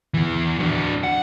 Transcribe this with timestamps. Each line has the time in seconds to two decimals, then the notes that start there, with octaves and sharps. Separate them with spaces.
0.14 E2 E3
0.59 F#3 D4
1.03 F#5